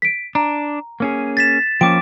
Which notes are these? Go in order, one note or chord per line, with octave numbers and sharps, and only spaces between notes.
B6 D7
D4 A#5
A#3 C#4 G#4
A6 B6 E7
F3 A#3 C#4 G5 D6 D7